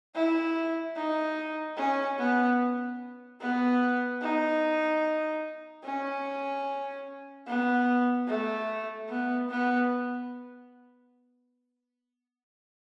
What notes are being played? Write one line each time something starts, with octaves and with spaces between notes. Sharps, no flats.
E4
D#4
C#4
B3
B3
D#4
C#4
B3
A3
B3
B3